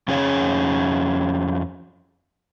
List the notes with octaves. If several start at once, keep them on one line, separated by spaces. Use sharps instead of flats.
F2 C#4 G#4 C#5